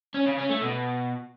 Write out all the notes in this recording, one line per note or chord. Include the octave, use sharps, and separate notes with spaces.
C#4
C#3
C#4
A3
B2